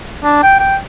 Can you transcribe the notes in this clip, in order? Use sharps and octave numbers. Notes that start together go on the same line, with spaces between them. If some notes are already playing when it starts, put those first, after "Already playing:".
D4
G5
G5